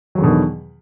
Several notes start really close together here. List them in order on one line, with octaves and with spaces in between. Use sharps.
F#3 E2 D3 B2 D#3